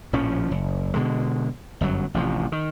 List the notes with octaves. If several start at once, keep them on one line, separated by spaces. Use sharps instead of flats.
A#1 A2 F3 C#4
F#1
B2 D3 G#3
G1 F#2 F#3
A1 G2 C3 F3
D#3